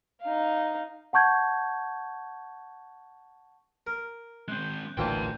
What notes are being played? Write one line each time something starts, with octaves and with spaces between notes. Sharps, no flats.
D#4 F5
F#5 A5 C#6 G6 G#6
A#4
G#3 C4 F#6 G6
A1 D2 A#2 E3 C4 G5 A5